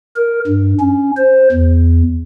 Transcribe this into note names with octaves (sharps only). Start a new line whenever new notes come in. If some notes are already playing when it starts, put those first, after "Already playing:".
A#4
G2
C#4
C5
E2